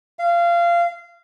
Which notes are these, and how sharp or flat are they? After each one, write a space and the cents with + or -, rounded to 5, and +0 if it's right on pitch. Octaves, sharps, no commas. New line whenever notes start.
F5 -20